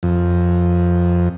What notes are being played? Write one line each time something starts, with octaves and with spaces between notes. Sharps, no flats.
F2